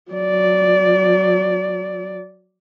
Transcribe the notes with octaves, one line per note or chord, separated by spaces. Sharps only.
F#3 D5